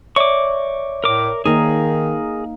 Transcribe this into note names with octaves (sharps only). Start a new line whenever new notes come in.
C#5 D5 E5 C#6 D6
A2 A#4 D6
D#3 A#3 D#4 G#4 A#4